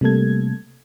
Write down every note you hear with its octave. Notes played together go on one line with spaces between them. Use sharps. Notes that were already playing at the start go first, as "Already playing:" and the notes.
C3 G3 A3 A#3 A4 G#6